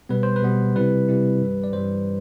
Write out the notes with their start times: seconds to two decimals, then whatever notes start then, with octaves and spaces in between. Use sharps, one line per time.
0.09 B2 G3 B3 B4
0.23 C5
0.36 B4
0.42 B2 G3 B3
0.75 C3 G3 C4 E4 B4
1.08 C3 G3 C4 E4
1.40 G2 E3 G3 D4
1.64 D5
1.73 G2 E3 G3 D4 C5